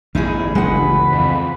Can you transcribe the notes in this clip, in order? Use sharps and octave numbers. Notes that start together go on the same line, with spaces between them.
A1 E2 G2 D3 D#4 E4 G#4
G1 C#2 G2 E3 G#3 B4 F#5
F2